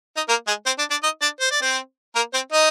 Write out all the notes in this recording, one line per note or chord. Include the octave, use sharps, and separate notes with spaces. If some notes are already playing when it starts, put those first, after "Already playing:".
D#4 D#5
A#3 A#4
G#3 G#4
C4 C5
D4 D5
D4 D5
D#4 D#5
D4 D5
C5
D5
C4 C5
A#3 A#4
C4 C5
D#4 D#5